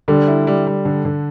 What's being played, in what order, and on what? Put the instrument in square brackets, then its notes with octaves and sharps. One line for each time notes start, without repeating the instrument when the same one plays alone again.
[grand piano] D3 [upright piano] G3
[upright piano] E4
G3
G3
D3
D3